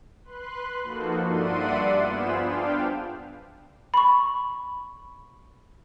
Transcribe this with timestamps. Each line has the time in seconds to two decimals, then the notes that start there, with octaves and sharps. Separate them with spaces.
0.24 B4 C6 F#6
0.83 F3 A#3 D#4 F#4 A4
1.25 G2 D5 E5 F#5 C6 D#7
2.02 B3 F4 G#4 C5 B5 E7
2.35 D4 F5 G5
3.94 B5 C#6